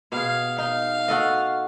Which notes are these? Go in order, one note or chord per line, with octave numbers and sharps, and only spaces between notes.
B2 G#4 F5
D#4 F5
F#4 A4 D#5